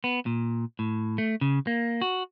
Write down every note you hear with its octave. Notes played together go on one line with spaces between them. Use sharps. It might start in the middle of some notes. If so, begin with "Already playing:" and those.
B3
A#2
A2
A3
C#3
A#3
F#4